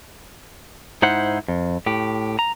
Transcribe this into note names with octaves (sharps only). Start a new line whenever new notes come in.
G#2 D#4 E4 C5 F#5
F2
A2 G4
A#5